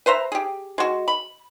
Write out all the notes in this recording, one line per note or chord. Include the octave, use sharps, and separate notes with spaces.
B4 C5 E5 A#5
G4 G#4
G#3 F#4
B5